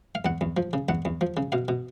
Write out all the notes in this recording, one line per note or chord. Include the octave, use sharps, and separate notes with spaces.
F5
E2 F#5
E2
F3
C#3
E2 F#5
E2
F3
C#3
B2 F5
B2